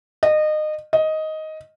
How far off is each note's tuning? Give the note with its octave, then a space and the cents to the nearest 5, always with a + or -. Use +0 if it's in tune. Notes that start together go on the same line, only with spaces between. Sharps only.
D#5 -25
D#5 +10